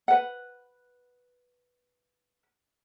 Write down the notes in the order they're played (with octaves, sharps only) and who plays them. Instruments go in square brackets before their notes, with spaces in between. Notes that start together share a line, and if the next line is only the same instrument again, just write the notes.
[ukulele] B4 F#5